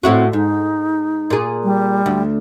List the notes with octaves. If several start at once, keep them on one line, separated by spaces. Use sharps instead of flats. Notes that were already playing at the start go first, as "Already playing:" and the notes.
A2 C4 E4 F#4
G#2 D#4
A#2 G#4
G3
D2